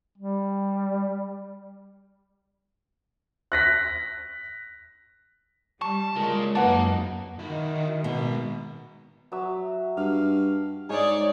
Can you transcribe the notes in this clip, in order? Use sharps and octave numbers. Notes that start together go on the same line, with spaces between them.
G3
F#6 A#6 B6
G3 A5 C#6
C#3 G#3 F4 A#4
F#2 A#3 D#4 B4 F#5 A5
D#3 E4 F#4
B2 G#3 A#4
F#3 E5 E6
G2 F5
G#2 D#4 G#4 C#5 D5